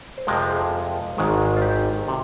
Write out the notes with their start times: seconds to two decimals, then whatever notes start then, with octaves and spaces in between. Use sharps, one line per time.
0.17 C5
0.27 F2 C3 F3 G#3 A#4
0.42 C5
0.51 G#4
0.57 A#4
1.17 G#1 G#2 D#3 G#3
1.57 F4
1.62 G4
2.08 C3